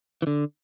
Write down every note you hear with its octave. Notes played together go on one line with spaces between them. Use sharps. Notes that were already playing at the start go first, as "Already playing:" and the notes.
E3
D3